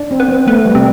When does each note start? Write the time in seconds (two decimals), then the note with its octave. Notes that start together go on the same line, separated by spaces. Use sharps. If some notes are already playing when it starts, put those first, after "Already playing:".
Already playing: D4
0.11 C4
0.20 B3
0.28 C4
0.47 A3 B3
0.66 G3
0.75 C3